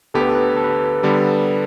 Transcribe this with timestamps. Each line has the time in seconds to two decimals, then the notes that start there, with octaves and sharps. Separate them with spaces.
0.14 D2 D3 B3 G4 A4
0.21 B4
0.29 A4
0.35 B4
0.42 A4
0.50 B4
0.57 A4
0.64 B4
0.70 A4
1.03 D3 G3 B3 G4